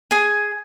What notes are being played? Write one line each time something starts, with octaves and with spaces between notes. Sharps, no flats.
G#4 G#5